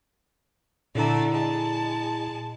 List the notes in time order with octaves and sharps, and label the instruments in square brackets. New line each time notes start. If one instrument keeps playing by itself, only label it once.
[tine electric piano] A#2 E4 A#5 [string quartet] D3 A3 D5
[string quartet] G#3 A5